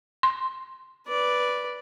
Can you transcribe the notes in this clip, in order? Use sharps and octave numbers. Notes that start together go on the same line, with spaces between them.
C6
B4 D5